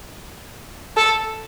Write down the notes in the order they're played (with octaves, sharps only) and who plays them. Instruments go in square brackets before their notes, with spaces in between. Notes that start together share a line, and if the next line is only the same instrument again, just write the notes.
[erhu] A4